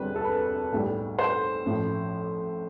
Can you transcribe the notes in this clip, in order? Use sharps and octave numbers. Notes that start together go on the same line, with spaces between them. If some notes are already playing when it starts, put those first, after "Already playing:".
Already playing: E1 D2 C3 G3 B4
A4
B4
B1 A2 G3
C5
A1 A2 F3